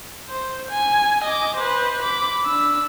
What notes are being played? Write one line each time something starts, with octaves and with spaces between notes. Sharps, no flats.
C5
G#5
D#5 D6
B4 C5
B5 D6
D4 E6